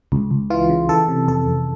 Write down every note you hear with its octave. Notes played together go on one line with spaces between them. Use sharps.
C#2
C#2
E3 F4
C#3
E3 A4
C3
F2 A4
F2